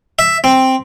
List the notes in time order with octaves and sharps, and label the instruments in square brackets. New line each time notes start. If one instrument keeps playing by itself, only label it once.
[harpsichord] E5
C4